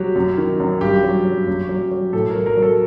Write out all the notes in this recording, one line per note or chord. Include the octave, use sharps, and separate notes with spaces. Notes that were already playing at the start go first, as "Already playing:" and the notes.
Already playing: F#3 G4
F#2
D#3
F#2
G2 G4
F#3
F#3
F#2
F#3
F#3
A2 A4
A#4
F#3
A#4
F#3
A4